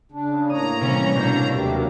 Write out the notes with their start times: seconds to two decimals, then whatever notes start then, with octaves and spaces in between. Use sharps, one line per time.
0.12 C#3 D4
0.50 A2 A#3 C#5 A#5 D#6
0.81 C3 E3 G3 C#4
1.16 B2 D4 G6
1.54 D#2 F#3 A3 A#3 G4